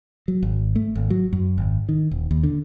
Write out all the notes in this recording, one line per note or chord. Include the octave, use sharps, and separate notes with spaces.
F#3
G#1
A3
G#1
F#3
F#2
G#1
D#3
D#1
D#2
D3